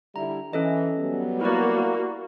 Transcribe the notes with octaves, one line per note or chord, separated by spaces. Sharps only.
D3 G3 E4 A#5
E3 C#4 A4 D#5
F#3 G3 B3
A#3 E4 F#4 D5